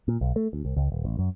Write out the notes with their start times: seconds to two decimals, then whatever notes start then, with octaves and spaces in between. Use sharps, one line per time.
0.08 A#2
0.21 B1
0.36 A3
0.53 D2
0.65 C2
0.77 C#2
0.92 D#1
1.05 A1
1.19 F#2